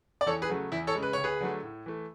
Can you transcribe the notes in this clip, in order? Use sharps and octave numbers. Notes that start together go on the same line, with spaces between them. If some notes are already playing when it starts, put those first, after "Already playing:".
D5
E2 A4 C#5
G#4 B4
C#3 F#3 A3
E2 E4
A4 C#5
C#3 G#3
B4
D2 C#5
G#4 B4
D3 F#3 A3
A2
E3 A3